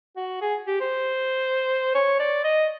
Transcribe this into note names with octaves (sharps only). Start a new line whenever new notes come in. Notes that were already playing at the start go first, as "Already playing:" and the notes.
F#4
G#4
G4
C5
C#5
D5
D#5